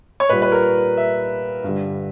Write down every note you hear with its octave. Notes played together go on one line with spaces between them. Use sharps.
C#5
A#2 G3 B4
B4
A#4
E5
G2 D3 G3